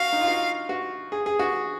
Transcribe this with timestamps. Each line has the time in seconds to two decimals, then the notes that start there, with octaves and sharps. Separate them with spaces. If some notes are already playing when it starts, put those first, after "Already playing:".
Already playing: F#4 F5
0.13 D#4
0.21 F4
0.27 F#4
0.69 F#4
1.12 G#4
1.26 G#4
1.39 F#4